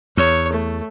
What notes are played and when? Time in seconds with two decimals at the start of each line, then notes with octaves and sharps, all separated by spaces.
0.17 E2 C#5
0.53 A3